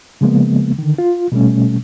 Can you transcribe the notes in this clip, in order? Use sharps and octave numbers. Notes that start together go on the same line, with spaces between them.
C#3 F3 G#3 A#3 B3
D3 D#3
F4
B2 G3 A3 C#4